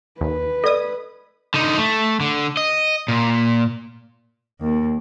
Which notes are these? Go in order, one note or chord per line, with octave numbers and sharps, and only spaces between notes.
D#2 B4
A4 D5 D#5 D#6 E6
D3 D#4
A3
D3
D#5
A#2
D#2